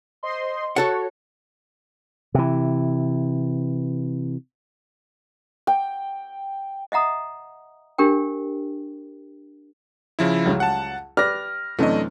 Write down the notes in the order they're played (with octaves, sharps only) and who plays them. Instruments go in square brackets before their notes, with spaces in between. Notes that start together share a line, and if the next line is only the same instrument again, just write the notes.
[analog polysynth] C5 D#5 C6
[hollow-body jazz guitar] F#4 A4 F#5 [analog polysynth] C#5
[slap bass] C3 E3
[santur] G5
[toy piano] D#5 E5 F#5 A#5 D#6
D4 G4 A#4 G5
[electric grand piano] C#3 F3 E4
[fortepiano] C#2 F#3 G3
[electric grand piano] F#5 A5
[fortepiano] G4 B4 D5 [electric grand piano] F6 A#6
[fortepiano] F#2 C3 E3 [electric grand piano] A3 D4 D#5